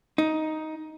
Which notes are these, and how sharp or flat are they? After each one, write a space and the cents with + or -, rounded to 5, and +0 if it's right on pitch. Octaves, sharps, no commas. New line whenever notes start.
D#4 +10